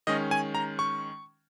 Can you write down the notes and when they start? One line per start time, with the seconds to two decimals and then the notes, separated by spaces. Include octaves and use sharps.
0.07 D#3 G#3 C#4 D#5
0.31 G#5
0.55 A#5
0.79 C#6